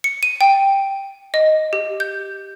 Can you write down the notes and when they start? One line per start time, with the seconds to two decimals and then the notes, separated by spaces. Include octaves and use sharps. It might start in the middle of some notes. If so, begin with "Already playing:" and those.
0.04 C#7
0.23 D#7
0.41 G5
1.34 D#5
1.73 G4
2.00 G6